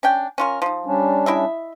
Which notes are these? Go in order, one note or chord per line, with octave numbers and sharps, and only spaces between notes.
C#4 D4 G5
C#4 F4 A#4
F3 D#4
G3 C#4 D4
E4 D#5 E5